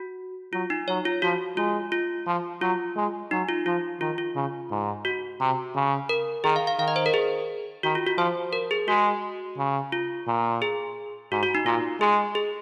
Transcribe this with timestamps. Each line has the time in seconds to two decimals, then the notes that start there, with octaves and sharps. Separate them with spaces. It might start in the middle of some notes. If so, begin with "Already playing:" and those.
Already playing: F#4
0.53 F#3 F4
0.70 D#4
0.88 F#3 C#5
1.05 F4
1.22 F3 F#4
1.57 G#3 F4
1.92 F4
2.26 F3
2.61 F#3 F4
2.96 G#3
3.31 F#3 D#4
3.49 F4
3.66 F3 F4
4.01 D#3 F4
4.18 F4
4.35 C#3
4.70 G#2
5.05 F#4
5.40 C3
5.75 C#3
6.09 A#4
6.44 D#3 G#4
6.56 F5
6.67 F5
6.79 D#3 F5
6.88 D#5
6.96 C5
7.06 A#4
7.14 G#4
7.83 D#3 F#4
7.95 F4
8.07 F#4
8.18 F3 C5
8.53 A#4
8.71 G#4
8.88 G#3 F#4
9.57 C#3
9.92 F4
10.27 A#2
10.62 G#4
11.32 G#2 F#4
11.43 F#4
11.55 D#4
11.66 A#2 F4
12.00 G#3 G#4
12.35 G#4